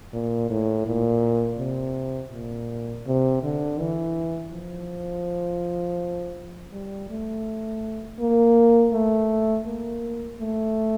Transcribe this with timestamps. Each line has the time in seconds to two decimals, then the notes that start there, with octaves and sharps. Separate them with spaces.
0.13 A#2
0.50 A2
0.86 A#2
1.59 C3
2.33 A#2
3.06 C3
3.43 D3
3.79 E3
4.53 F3
6.73 G3
7.09 A3
8.19 A#3
8.93 A3
9.66 A#3
10.39 A3